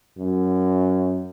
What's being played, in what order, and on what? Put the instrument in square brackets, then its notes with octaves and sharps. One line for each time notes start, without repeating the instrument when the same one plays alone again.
[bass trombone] F#2